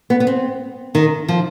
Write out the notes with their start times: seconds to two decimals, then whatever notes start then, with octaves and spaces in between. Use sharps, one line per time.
0.10 B3
0.20 B3
0.27 C4
0.95 D#3
1.28 F3